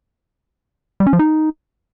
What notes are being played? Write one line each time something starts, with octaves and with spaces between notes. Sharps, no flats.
G3
C#4
F3
D#4